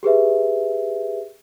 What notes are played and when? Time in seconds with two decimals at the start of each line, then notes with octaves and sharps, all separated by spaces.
0.03 G4 G#4 B4 E5